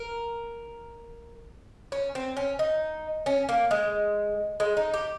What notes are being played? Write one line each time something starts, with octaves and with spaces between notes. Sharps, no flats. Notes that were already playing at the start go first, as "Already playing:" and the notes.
Already playing: A#4
C#4
C4
C#4
D#4
C#4
A#3
G#3
G#3
D#4
G4